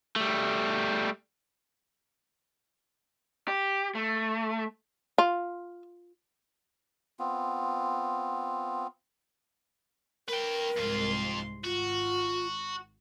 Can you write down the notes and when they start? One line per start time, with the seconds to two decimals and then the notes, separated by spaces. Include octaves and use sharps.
0.16 G3 A3
3.48 G4
3.95 A3
5.18 F4
7.19 B3 C4 F4
10.28 A#4 B4 G5
10.76 C2 F2 G#2 F4 C6
11.64 G#1 F4 F#4